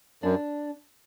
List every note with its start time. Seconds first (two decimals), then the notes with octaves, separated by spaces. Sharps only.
0.23 F#2 D4